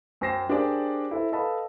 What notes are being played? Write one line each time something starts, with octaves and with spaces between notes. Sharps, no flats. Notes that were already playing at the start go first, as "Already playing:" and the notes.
F#2 C5 G5 A#6 C7 E7
D4 G4 G#4 A#4 C5 D5
E4 A4 C5
A4 B4 D#5 F5 A5 B5